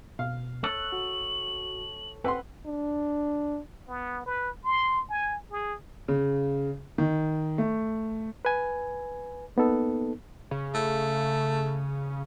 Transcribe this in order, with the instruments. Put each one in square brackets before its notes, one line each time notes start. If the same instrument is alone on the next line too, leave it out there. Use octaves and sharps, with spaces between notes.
[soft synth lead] B2 [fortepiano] F5
[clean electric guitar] A4 C#5 [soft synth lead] F#6 [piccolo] F#7
[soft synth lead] F#4
[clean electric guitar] C4 [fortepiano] B4 F#5 C6 [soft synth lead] B5
[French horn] D4
[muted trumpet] B3
B4
C6
G#5
G#4
[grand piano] C#3
D#3
A3
[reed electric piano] B4 G#5
A#3 B3 D#4 A4
[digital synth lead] C#3
[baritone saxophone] A3